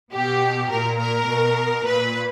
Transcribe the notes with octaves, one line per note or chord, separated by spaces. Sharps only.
B2 G4
A#2 A#4
A#4
B2
A#2 B4